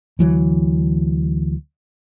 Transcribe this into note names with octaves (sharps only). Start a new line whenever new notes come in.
D2 E3 F#3